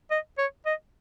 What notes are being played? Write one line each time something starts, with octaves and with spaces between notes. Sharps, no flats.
D#5
C#5
D#5